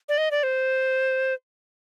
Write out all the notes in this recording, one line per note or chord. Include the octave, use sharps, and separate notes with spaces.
D5
D#5
D5
C5